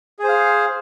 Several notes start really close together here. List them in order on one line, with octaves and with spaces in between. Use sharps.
G#4 C5 F5